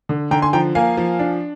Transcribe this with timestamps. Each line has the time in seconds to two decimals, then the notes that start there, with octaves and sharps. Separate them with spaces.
0.09 D3
0.31 D3 G5 A#5
0.42 G#5 C6
0.53 F3 G5 A#5
0.75 A#3 F5 G#5
0.97 F3
1.19 D4